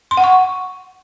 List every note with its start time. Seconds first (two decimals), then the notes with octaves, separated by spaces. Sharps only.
0.11 C6
0.17 F#5
0.24 C#6